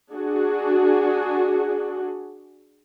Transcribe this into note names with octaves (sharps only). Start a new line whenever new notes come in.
D4 F#4 G#4